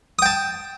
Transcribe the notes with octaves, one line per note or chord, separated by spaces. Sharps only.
G5 A5 D#6